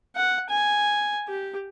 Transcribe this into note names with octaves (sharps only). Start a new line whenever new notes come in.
F#5
G#5
G4